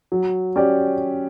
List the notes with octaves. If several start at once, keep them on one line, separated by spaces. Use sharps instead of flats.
F#3
C#4 G4 D5